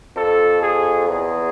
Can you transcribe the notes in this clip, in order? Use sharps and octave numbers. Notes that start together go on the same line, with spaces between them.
F2 A4
G#4
E2 G#4